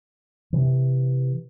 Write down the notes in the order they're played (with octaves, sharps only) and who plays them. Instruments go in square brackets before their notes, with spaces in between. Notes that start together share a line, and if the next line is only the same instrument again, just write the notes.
[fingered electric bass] C3 E3